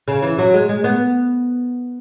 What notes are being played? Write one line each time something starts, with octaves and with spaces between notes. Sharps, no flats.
C#3
E3
F#3
G#3
G#3
B3